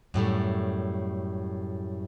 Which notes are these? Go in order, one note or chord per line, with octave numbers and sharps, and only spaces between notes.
F#2 A2 G3 A3